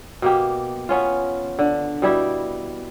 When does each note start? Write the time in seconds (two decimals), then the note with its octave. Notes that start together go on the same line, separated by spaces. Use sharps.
0.22 B2 A#3 G4
0.89 B3 C#4 F4
1.59 D3
2.02 B2 G3 E4 G4